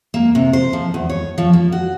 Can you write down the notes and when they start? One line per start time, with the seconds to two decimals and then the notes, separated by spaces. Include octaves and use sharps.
0.14 A#3
0.35 C3
0.53 C5
0.73 F3
0.94 E2
1.09 C#5
1.38 F3
1.53 A#3
1.72 F#4